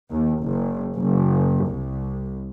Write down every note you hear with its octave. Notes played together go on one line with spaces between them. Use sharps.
D#2
F#1
F#1
C2